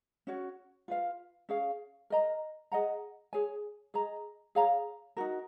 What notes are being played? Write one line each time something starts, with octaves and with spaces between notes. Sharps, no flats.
C#4 F#4 C#5
F4 B4 F5
C#4 G#4 C#5 F5
A#4 D#5 A#5
G#4 D#5 F#5 A#5
G#4 C#5 G#5
G#4 D#5 A#5
G#4 C#5 F5 A#5
D#4 F#4 A#4